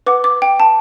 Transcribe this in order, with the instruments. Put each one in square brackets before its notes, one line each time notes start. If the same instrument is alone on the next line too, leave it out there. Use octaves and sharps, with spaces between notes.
[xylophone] B4 F#5 D6
D6
G5
A5